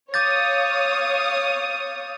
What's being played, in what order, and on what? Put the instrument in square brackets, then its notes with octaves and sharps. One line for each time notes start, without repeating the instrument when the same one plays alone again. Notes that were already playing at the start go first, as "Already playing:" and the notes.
[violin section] C#5 F5 D#6 [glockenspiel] D6 G6 A6